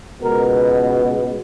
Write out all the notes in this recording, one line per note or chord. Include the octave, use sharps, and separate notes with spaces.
C#2 B2 G#3 B3 A#4